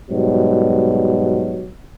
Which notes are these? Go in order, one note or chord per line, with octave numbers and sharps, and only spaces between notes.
G#2 B2 F#3 G3